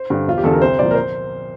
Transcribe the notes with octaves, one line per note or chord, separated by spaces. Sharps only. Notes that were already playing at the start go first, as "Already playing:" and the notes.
Already playing: C5
G2 D3
E1 F4
G4
E2 D3 A4
A#4
C2 C5
A#2 F3 D5
A#4
C5